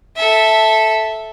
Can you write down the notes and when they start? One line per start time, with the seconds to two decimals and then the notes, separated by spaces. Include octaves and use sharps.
0.16 A4 E5